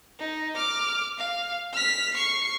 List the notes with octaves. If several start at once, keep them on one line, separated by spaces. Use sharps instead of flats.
D#4
D6 F6
F5
F6 B6
C#6 C7